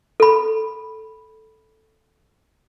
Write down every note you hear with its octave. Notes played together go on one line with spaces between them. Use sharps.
A4 B5